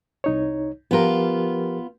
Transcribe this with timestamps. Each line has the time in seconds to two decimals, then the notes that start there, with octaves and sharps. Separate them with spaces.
0.24 C2 D#4 C#5
0.91 F3 B3 F4 G4 A#4